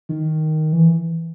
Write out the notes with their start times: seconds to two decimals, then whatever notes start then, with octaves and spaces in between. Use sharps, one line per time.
0.09 D#3
0.73 E3